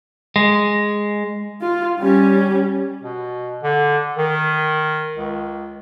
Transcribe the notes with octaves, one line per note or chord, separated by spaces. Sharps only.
G#3
F4
G3 C#4
B2
D3
D#3
C#2